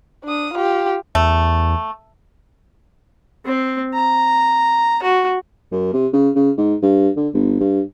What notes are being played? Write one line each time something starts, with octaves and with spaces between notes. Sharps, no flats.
D4 D#6
F4 G4
E2 A3
C4
A#5
F#4
F#2
C3
C#3
C#3
G#2
G2
D3
G1
G2